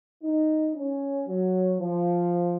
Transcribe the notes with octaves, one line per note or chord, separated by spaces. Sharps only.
D#4
C#4
F#3
F3